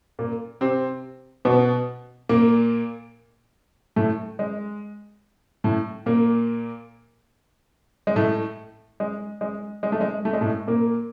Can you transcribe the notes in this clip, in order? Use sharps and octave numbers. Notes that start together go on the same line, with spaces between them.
A#2 A#3
C3 C4
B2 B3
A#2 A#3
A2 A3
G#3
A2 A3
A#2 A#3
G#3
A2 A3
G#3
G#3
G#3
A3
G#3
A3
G#3
A2 A3
A#2 A#3